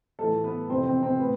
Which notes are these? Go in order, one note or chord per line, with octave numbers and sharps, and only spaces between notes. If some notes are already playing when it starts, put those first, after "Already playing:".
A2 E3 A3 A4
B3 B4
F2 C3 E3 C4 C5
C4 C5
C4 C5
A2 B3 B4